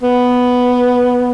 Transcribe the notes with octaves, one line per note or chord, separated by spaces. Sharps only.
B3